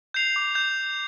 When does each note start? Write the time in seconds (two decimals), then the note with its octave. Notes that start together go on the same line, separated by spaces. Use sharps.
0.14 G6 C7 F7
0.36 D6
0.55 G6